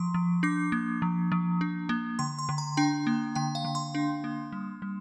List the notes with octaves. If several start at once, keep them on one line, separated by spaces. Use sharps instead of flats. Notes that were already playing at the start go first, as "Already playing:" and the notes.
Already playing: F3 C6
F3
D4 D6
A#3
F3
F3
D4
A#3
D3 C6
C6
D3
A#5
D4 G5
A#3
D3 G5
F5
D3
C6
D4
A#3
G3
G3